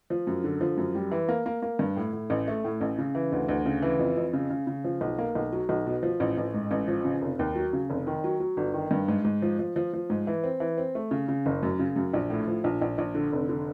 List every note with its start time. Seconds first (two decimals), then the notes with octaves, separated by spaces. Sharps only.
0.10 F3
0.27 F#2
0.44 D3
0.61 F3
0.77 F#2
0.95 G3
1.11 E3
1.29 A#3
1.46 A#3
1.62 A#3
1.79 G2
1.97 A2
2.13 A2
2.30 A1
2.48 A3
2.65 A2
2.81 A1
2.98 C#3
3.15 E3
3.32 D2
3.48 D2
3.66 C#3
3.82 E3
3.99 F2
4.17 F2
4.33 C#3
4.50 C#3
4.67 C#3
4.84 F3
5.01 B1
5.18 A#3
5.35 B1
5.52 F#3
5.69 B1
5.86 B2
6.03 F3
6.20 A1
6.37 A1
6.54 G#2
6.71 A1
6.88 F3
7.05 C#3
7.22 F1
7.39 D#2
7.55 F#3
7.73 C#3
7.90 F1
8.07 D#3
8.24 F#3
8.40 F#3
8.57 G1
8.74 D#3
8.91 G2
9.08 G#2
9.25 G#2
9.42 F3
9.59 F3
9.76 F3
9.93 F3
10.10 G#2
10.27 E3
10.43 C4
10.60 E3
10.77 C4
10.95 A3
11.11 C#3
11.28 C#3
11.46 F#1
11.63 F#2
11.79 C#3
11.96 F#2
12.14 A#1
12.30 A2
12.47 F3
12.64 A#1
12.81 A#1
12.98 A#1
13.15 D3
13.33 F1
13.49 D3